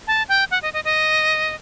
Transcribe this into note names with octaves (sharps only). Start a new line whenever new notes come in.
A5
G5
F#5
D#5
D#5
D#5